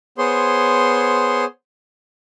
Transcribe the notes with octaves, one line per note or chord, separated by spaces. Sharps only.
B3 G#4 C5 C#5 C6